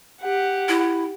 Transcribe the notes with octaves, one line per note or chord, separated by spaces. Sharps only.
G4 F#5
E4